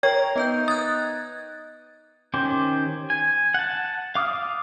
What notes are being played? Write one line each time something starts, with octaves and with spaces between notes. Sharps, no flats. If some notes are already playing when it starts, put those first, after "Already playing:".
A#4 C#5 G5 C#6
B3 D#4 B4 G6
D#6 F#6 G#6 A6
D#3 C#4 G4 C5
G#5
F#5 A5
F5 D6 D#6 F6